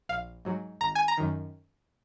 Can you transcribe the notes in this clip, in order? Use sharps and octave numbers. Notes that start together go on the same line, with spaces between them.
A#1 F5
G#2 F#3
G#1 A#5
G#5
A#5
F#2 D#3